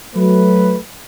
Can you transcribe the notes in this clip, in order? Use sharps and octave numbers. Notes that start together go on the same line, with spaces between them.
F#3 A3 B4